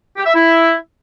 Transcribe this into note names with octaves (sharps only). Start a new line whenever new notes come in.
G4
E5
E4